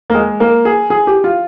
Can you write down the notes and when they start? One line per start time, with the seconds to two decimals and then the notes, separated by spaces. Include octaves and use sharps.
0.10 A#3
0.15 G#3
0.40 A#3
0.65 G#4
0.90 G#4
1.07 G4
1.24 F4